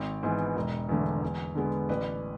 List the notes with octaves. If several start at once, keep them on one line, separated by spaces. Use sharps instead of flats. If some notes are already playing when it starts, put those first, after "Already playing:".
Already playing: G#1 D5
G#2 E3 B3
E1
E2 D3 A3
E2
D3 G#3 B3
A1 B4 D5